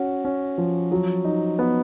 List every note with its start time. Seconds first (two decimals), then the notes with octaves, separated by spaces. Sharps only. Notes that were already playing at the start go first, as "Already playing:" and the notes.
Already playing: C#4 F#4
0.25 C#4
0.58 F3
0.92 F#3
1.25 D#4
1.59 B3